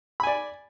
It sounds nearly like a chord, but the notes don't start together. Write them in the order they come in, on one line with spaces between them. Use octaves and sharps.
B5 G#5 D5